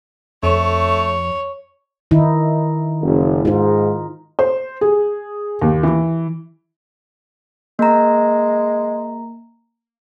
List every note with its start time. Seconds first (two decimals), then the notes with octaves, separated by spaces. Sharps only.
0.43 F2 A3 C#5
2.11 D#3 D#4 E4
3.02 F#1
3.45 G#2 D#4 F4
4.39 C5
4.81 G#4
5.62 D#2
5.83 E3
7.79 G#3 A#3 A#5